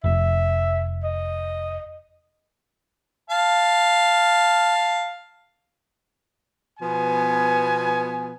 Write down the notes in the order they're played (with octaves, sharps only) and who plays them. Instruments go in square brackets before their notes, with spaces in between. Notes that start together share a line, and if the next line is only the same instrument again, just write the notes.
[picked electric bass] F1 [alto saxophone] E5
[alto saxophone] D#5
[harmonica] F5 A5
[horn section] B2 F3 B3 G#5